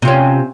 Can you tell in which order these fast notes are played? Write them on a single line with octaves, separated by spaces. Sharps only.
C3 F4 C#4